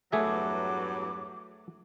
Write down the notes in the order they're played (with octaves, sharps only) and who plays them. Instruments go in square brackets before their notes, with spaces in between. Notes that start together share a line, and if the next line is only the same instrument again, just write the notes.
[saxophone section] E2 G2 F#3 [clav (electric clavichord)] A3 G#4 E5 [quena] D6